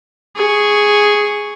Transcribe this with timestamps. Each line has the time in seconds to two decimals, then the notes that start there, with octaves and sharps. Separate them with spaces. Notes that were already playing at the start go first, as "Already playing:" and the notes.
0.36 G#4 C#6